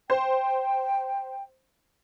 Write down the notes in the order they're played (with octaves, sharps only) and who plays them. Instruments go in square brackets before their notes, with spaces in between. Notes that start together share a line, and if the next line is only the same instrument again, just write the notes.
[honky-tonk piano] C5 [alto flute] G5